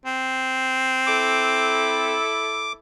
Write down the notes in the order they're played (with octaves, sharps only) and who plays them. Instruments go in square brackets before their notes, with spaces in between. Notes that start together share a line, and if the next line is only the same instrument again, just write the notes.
[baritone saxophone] C4
[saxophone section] E4 A4 [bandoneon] D6